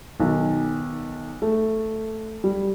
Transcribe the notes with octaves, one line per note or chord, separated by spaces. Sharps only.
B1 D#3
A3
G3